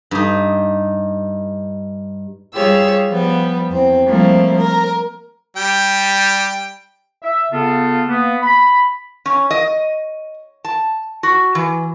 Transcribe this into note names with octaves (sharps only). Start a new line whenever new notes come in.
G2 D#4
G3 F4 G4 G#4 C#5 E6
F3 G3 B3
E2 C4
F3 G3 A3 A#3 C4 E4
A#4
G3 G5
E5
C#3 B3 F4 A4
A#3 B3
B5
C#4
D#5
A5
F#4
E3